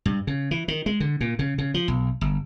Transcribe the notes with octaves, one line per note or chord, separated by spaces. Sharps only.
G2
C#3
E3
D#3
G#3
D3
A#2
C#3
C#3
F3
B1
G1